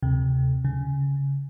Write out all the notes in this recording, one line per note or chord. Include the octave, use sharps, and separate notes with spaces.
D2 C3
C#3